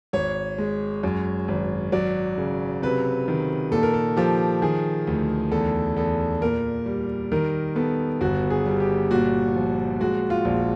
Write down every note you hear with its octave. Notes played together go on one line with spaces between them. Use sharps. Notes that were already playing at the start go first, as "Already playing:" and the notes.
G#1 C#5
G#3
F#2
G#1
F#3 D5
C#3
C3 B4
D#3
A#2 A4
A#4
A4
F3 G4
D#3 G#4
D2
E2 A4
E2 A4
A#2 A#4
G3
D#3 A#4
B3 A4
G1 F#4
G#4
G3
G4
A#2 F#4
F3
G#3 F#4
F4
A#1